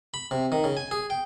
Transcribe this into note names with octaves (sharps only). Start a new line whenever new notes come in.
B5
C3
D#3
C#3
G#5
G#4
G5